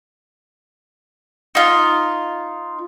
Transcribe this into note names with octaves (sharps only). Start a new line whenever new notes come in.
D#4 F4